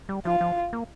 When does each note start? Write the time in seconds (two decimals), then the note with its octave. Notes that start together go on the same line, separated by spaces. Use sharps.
0.09 G3
0.25 F3 F4
0.41 F3
0.73 A#3